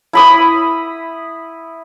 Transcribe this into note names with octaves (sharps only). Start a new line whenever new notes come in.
E4 B5 D#6